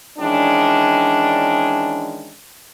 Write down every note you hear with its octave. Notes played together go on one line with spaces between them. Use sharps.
D#3 E3 G#3 C#4 D4